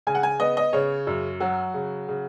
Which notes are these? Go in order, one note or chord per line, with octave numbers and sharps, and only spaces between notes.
C#3 G#5
F#5
G#5
B3 D#5
D#5
C#3 C#5
F#2
F#3 F#4
C#3
C#3